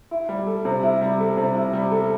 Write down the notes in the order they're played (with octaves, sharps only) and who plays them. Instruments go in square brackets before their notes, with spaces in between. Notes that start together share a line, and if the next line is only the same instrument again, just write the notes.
[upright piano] E4
G3
A4
C3
E4
G3
A4
C3
E4
G3
A4